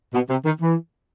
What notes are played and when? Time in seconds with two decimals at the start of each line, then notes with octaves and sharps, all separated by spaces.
0.14 B2
0.29 C3
0.45 D#3
0.61 E3